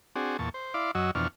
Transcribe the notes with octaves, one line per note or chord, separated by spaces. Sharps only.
C4 D4 F#4 G#4
E2 A#2 A5 C#6
C5
E4 D5 F5 C6 D6
F#2 F#3 F#4 D#5 E6
F2 B2 E3 D4 C#6 F6